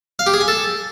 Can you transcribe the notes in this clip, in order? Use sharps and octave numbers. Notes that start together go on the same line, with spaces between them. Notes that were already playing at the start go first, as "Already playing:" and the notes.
F5
G4
G#4
G#5
A4